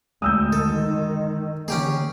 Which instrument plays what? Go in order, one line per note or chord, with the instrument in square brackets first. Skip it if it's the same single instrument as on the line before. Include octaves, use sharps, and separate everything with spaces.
[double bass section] D2 [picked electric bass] G#3 [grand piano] D#6 E6 G6
[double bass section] D#3 [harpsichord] A4
[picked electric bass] D3 E3 A#3 [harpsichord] C#4 G4 G#4